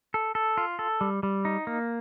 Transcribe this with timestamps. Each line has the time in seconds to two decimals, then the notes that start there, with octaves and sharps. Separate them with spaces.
0.14 A4
0.35 A4
0.57 F4
0.79 A4
1.01 G3
1.23 G3
1.45 D#4
1.67 A#3